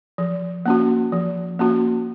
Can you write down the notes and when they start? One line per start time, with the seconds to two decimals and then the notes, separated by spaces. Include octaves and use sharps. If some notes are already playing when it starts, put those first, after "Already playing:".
0.18 F3
0.66 A#3 C#4 F#4
1.12 F3
1.59 A#3 C#4 F#4